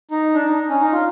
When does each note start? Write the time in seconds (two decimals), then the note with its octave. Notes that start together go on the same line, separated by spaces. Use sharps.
0.11 D#4
0.34 D4
0.46 D#4
0.69 C#4
0.80 D#4
0.92 F4